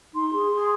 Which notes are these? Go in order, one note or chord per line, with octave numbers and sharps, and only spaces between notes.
D#4 C6
G#4
G#4